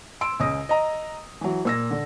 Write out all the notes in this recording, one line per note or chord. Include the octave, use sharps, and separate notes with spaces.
C6 E6 D7
C#2 C#3 D#6 A#6
D#5 A#5
E3 F#3
A#2 E6 A#6
D3